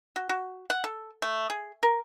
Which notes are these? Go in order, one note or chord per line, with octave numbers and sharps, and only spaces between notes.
F#4
F#4
F#5
A4
A3
G#4
A#4